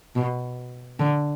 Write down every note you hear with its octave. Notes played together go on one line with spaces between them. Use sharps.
B2
D3